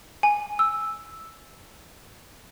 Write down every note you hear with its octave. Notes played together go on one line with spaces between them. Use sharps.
G#5
E6